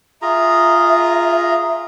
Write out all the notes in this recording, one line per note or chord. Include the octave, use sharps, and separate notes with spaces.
F4 G#4 E5 A#5